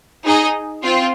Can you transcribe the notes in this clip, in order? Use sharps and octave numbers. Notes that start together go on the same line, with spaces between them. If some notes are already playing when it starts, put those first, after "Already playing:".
D#4 G#4 D#5
C4 F4